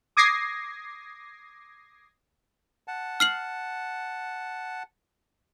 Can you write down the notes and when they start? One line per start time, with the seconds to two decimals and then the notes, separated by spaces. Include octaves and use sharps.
0.17 D6 D#6 G#6 A#6 C7
2.88 F#5 A5
3.20 F6 C7 F#7